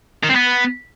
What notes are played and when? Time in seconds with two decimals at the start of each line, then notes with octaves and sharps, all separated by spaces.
0.24 D#3
0.30 C4
0.36 B3